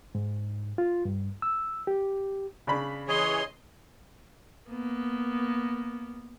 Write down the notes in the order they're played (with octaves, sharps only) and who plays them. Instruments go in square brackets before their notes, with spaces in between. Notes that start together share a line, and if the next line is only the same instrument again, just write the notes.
[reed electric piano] G#2
F4
G2
E6
G4
[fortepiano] C#3 D4 B5
[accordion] E3 G#4 C#5 [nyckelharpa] D#5 C6
[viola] A#3 B3